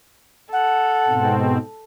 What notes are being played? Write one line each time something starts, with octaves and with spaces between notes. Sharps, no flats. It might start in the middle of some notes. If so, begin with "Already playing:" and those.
A4 F#5
G#2 B2 C4